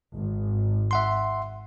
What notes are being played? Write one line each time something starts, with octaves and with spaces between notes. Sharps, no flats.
G#1
E5 F#5 C6